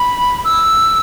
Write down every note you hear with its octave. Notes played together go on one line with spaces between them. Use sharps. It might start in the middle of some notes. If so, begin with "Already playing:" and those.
Already playing: B5
E6